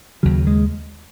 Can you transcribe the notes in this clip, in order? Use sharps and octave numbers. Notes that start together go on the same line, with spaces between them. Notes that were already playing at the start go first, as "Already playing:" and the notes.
D#2 C#3 F#3
G#3